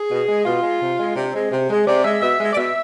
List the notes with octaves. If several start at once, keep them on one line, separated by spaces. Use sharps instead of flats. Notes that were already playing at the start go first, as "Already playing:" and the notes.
Already playing: G#4
B2
G#3
B2 F4
G#3
C3
G#3
C3 D4
G#3 C4
C3
G#3
C3 D5
G#3 E5
B2 E5
G#3
D5
B2 E5